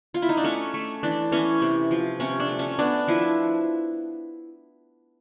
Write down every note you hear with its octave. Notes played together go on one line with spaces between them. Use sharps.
F4
E4
D#4
D4
A3 C#4
A3
E3 D4
E3 C#4
C3
F3
C3 C#4
D4
A3
C#4
B3 D4
F3 E4